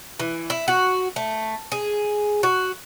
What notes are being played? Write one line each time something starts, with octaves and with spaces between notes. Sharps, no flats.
E3
E4
F#4
A3
G#4
F#4